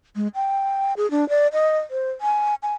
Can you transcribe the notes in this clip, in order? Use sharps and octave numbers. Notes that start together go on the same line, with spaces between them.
G#3
G5
G#4
D4
D5
D#5
C5
G#5
G#5